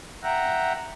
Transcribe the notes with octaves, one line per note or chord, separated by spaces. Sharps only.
E5 F#5 G5 A#5